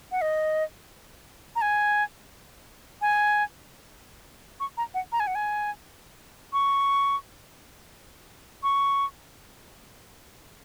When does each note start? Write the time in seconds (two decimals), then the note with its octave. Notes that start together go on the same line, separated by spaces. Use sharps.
0.12 F#5
0.21 D#5
1.56 A#5
1.62 G#5
3.02 G#5
4.60 C#6
4.77 A#5
4.94 F#5
5.12 A#5
5.20 G#5
5.27 F#5
5.35 G#5
6.53 C#6
8.63 C#6